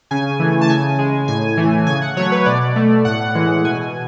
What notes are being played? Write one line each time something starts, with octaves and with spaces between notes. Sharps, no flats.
C#3 G#5
E3 A3
A5
C#3 G#5
G#3
A2 G#5
E3 A3
C#3 G#5
F#5
F#3 A3 C#5
B4
B2 D5
A3
A2 F#5
E3 G#3
B2 G#5